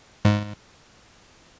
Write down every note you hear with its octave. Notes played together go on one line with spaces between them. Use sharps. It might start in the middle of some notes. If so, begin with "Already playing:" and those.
G#2